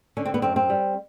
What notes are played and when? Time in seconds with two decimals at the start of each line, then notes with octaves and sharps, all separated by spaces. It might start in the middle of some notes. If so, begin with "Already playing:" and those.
0.17 D3 C#4
0.25 C4
0.34 B3
0.42 F#2 C4
0.56 C4
0.70 G3